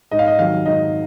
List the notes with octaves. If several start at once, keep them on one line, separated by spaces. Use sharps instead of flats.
G#2 D#5
F5
D#5
D#3 F#3 F5
G#2 D#5